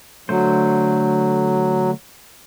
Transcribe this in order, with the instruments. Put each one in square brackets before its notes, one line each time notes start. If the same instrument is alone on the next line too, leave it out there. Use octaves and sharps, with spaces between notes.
[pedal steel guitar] D3 A3 C5 [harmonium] F#3